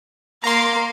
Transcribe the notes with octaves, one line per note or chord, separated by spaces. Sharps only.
A#3 F5 A#5 C6